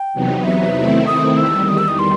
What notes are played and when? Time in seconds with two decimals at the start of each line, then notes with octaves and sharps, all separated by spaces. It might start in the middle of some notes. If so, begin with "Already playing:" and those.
Already playing: G5
0.13 E2 C3 F#3 B3 D#4
0.44 E5
0.76 D#3 A3 C4 E4
1.07 D#6
1.37 E2 D#3 G3 E6
1.68 D#6
1.78 E6
1.88 D#6
1.99 C6